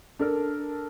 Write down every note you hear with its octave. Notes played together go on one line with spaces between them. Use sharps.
D4 A4 A#4